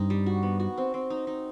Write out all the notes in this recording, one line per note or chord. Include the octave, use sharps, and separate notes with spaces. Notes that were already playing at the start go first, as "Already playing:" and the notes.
Already playing: G2 C4 D#4
G3
F#4
B3
F#4
C4
C4
D#4
D#4